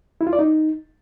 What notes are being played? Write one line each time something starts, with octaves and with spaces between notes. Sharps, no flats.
E4
F4
D5
D#4